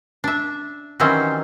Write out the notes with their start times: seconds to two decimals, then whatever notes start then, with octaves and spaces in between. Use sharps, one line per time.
0.24 D4 E5
1.00 D#3 E3 F#3 G3 C4 C#4